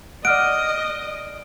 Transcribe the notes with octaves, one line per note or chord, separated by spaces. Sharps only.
D5 D#5 F#5 F6 F#6 D7